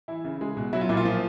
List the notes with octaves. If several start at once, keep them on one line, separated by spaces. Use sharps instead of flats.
E3 E4
C#3
G#3
B2
F#3 E4
F4
A#2 E4
F4
F3